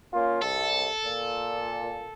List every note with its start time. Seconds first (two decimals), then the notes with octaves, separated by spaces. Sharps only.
0.13 A#3 C#4 F4
0.42 C2 A4
1.03 A#2